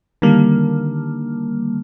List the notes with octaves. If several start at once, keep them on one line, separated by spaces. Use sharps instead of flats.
D3 D#3 G3 A#3